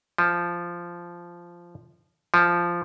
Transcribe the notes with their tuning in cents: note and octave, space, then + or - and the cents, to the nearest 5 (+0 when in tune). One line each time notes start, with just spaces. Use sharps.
F3 -10
F3 -10